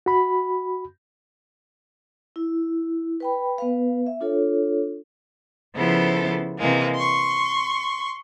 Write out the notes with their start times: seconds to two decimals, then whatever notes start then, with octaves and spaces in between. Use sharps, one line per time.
0.06 F#4 B5
2.36 E4
3.20 B4 G5 B5
3.58 B3 B4 F5
4.06 E5
4.21 D4 F4 A4 C#5
5.75 C#3 F3 B3 E4 A4 C5
6.59 C3 E3 G#3 A#3
6.95 C6 C#6